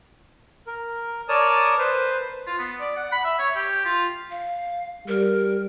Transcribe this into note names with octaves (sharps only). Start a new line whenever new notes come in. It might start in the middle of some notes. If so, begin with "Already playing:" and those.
A#4
A#4 C#5 D5 A5 D#6
B4 C5
F4
B3
D5
F#5
B5
E5
C#5
G4
F4
F5
G3 A#4